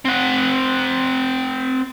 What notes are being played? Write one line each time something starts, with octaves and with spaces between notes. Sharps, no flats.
C4 F#5